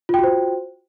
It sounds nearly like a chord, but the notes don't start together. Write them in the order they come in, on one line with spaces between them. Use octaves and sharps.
F4 G5 F#4 C5